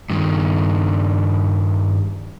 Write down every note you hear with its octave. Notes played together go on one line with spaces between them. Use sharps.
G2 D#3